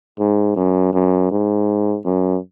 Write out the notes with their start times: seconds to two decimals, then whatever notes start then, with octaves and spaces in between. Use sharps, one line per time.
0.19 G#2
0.56 F#2
0.93 F#2
1.31 G#2
2.05 F#2